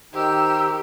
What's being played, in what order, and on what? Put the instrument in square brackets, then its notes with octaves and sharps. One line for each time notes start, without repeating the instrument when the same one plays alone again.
[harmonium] D#3 D#4 [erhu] G4 [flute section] C5 E6